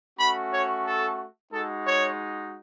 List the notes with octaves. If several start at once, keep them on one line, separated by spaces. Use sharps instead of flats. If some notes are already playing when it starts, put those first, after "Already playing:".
A3 C#4 F#4 B5
C#5
A4
G#3 D#4 F#4 A4
C#5